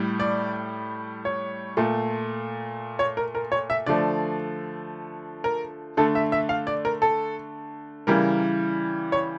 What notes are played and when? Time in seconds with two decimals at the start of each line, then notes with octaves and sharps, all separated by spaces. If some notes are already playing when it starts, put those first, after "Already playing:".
Already playing: A2 G3
0.20 D5
1.25 C#5
1.77 A#2 A3
2.99 C#5
3.17 A#4
3.35 A#4
3.52 C#5
3.70 E5
3.86 D3 F3 A3 D5
5.44 A#4
5.97 D3 A3 A4
6.15 E5
6.32 E5
6.49 F5
6.67 D5
6.85 A#4
7.02 A4
8.07 C#3 E3 G3 A#4
9.12 C#5